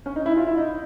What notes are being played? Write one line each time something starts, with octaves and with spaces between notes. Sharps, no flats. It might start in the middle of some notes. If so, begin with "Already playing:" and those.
C#4
D#4
E4
F4
E4
D#4